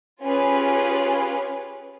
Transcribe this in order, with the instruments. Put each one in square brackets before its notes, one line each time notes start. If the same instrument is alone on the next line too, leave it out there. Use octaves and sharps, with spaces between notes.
[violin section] C#4 F4 G4 G#4 B4